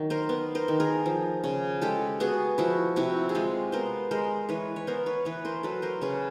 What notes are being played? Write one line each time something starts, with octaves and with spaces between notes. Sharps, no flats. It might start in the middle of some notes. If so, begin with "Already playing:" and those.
Already playing: D#3 F#3
A#4 C5
B3
A#4 C5
D#3
G#4 A#4
F3
C#3
G#3 G4 A4
B3 F#4 G#4
F3 E4 F#4
C3 E4 F#4
G#4
G#3 F4 G4
B3 A#4 C5
G#3 A#4 C5
E3 B4 C#5
C#5
B3 A#4 C5
B4 C#5
E3 B4 C#5
A#4 C5
F#3 A4 B4
A#4 C5
C#3 B4 C#5